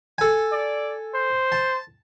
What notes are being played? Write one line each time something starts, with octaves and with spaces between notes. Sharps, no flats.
A4 G#5
D5
C5
A5